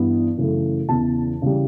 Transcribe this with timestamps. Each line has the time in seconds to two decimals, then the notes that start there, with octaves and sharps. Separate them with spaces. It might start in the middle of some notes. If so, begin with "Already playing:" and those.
Already playing: G2 E3 B3
0.37 F#2 C#3 E3 A3
0.89 E2 C#3 E3 A5
1.42 C#3 E3 G3